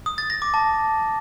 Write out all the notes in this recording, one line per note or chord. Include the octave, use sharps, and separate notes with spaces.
D#6
A6
A#6
D6
A5